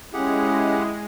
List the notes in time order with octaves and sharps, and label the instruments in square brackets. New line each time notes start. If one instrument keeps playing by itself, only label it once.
[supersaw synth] G#3 [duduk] C#4 [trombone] E4 [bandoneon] G4 G#4 F#5